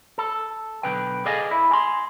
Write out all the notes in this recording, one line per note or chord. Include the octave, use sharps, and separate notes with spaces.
A4
B1 D3 B4 G5
G#4 A4 D5 D#5 F5 G#5
E4
G#5 C6